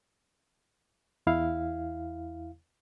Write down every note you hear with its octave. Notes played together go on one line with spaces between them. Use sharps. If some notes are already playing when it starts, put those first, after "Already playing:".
E2 E4 F5